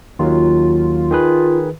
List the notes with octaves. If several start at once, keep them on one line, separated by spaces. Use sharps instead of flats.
D#2 D#3 F#3 F4
D#3 G#4 B4